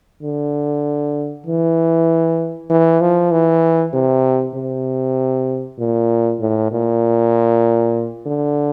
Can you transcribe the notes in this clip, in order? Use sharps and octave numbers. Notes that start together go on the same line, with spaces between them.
D3
E3
E3
F3
E3
C3
C3
A#2
A2
A#2
D3